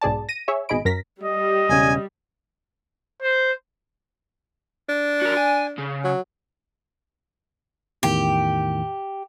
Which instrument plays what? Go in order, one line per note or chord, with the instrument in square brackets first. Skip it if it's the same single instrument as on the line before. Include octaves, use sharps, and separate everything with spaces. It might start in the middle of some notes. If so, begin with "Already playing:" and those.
[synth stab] B1 G#2 G#4 D5 A5
A#6 D#7
G#4 C#5 E5
G#1 B2 G#4 D#5 B5 D7
F#2 A#4 A#6 B6
[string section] G3 [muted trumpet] D#5
[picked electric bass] E1 C#3 [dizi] G#5
[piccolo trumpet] C5
[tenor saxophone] D4
[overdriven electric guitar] F#4 A#4
G#5
C#3
[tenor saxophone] F#3
[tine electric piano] E2 A2 D#3 [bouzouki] G4